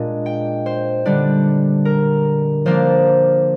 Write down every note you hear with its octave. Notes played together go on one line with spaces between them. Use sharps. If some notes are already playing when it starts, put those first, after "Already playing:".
Already playing: A#2 G#3 D4 D#5
G5
C5
D3 G3 D4
A#4
F3 A#3 D4 C5